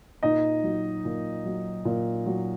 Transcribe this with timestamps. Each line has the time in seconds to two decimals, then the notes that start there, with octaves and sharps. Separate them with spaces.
0.23 A#2 D#4 D#5
0.64 F#3
1.05 A#2
1.45 F#3
1.85 A#2
2.26 F#3